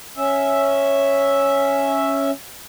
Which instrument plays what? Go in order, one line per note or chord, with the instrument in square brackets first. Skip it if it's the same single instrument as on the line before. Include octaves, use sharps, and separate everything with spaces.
[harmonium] C#4 E5